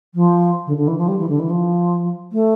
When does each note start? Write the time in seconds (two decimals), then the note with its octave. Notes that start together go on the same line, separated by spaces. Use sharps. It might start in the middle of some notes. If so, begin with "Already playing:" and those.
0.15 F3
0.67 D3
0.77 D3
0.87 E3
0.98 F3
1.08 G3
1.19 E3
1.29 D3
1.39 E3
1.50 F3
2.32 A3